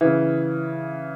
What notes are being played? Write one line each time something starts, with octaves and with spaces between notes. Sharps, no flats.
C#3 E3